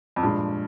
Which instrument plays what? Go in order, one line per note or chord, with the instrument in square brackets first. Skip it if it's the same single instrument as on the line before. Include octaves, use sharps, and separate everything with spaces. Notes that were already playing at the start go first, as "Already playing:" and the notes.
[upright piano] F2
[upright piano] G2 [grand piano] A#2 F3 G#3